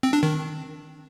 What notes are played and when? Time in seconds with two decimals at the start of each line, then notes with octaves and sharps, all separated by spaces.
0.03 C4
0.13 D4
0.23 D#3